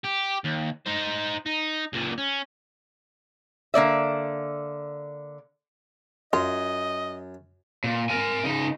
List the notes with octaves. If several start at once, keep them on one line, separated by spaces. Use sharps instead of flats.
G4
D#2
D#4 C5
D#4
C#2 A#2
C#4
D3 A#3 D5 E5
F#2 F4 D#5
A#2
A#4 G#5
C#3 D#4